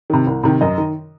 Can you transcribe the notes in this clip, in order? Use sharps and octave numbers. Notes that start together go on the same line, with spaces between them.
C3 D#3
C2
C3 D#3
F#2 D#5
D#3